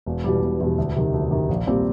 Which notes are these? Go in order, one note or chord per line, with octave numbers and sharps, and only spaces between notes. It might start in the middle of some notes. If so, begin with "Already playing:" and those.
E1
E2 B2 G3
E1
E2 B2 G3
D2
C3 D#3
D2
C3 D#3
A#1
A#2 G3 C4